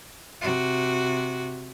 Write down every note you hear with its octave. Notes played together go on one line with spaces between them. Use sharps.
C3 F#4